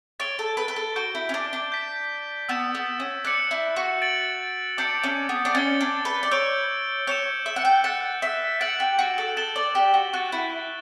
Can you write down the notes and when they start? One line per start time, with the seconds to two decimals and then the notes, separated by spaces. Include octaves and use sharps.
0.20 C#5 A6 D7 G7
0.39 A4
0.57 B4
0.68 B4
0.76 A4
0.96 F#4 G6 D7 G7
1.15 E4
1.29 C#4
1.34 D4
1.53 D4
1.72 G6 B6 D7
2.49 B3 E6 A6 E7
2.75 B3
3.00 C#4
3.25 D4 F#6 C#7 F#7
3.51 E4
3.76 F#4
4.02 A6 D7 F#7
4.78 D4 D6 G6 C#7
5.03 C#4
5.29 B3
5.45 D4
5.55 C#4 A6 C#7 G7
5.81 D4
6.05 B4
6.23 D5
6.31 C#5 E6 G6 D7 G7
7.07 C#5 E6 G6 C#7 E7 G7
7.46 E5
7.56 F#5
7.65 G5
7.84 F#5 F#6 A6 E7
8.22 E5
8.60 F#5 A6 D7 F#7
8.80 G4
8.99 F#4
9.18 A4
9.37 A4 A6 E7 G7
9.56 D5
9.75 G4
9.94 F#4
10.13 F#4 C#6 F#6 A6
10.32 E4